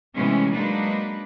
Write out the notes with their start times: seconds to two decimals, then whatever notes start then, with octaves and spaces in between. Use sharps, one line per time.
0.15 C3 E3 G#3 A3 B3 C#4
0.52 F#3 G#3 A#3 D4 D#4 B4